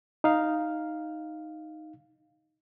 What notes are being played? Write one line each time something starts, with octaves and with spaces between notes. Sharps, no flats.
D#4 F5